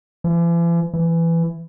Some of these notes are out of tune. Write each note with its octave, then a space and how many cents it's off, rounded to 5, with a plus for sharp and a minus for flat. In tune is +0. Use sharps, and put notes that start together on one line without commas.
E3 +45
E3 +15